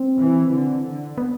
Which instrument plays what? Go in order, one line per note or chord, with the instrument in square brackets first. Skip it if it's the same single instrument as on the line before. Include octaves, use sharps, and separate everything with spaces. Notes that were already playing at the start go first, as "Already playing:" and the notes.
Already playing: [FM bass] C4
[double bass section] E3
D3
D3
[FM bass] B3